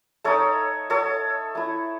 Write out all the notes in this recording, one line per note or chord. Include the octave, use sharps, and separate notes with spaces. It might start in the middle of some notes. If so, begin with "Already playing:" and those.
A3 D#4 A4 C#5
A4 C#5
A3 E4